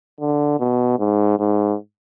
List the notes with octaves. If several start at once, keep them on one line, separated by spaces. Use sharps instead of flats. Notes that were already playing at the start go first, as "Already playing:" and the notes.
D3
B2
G#2
G#2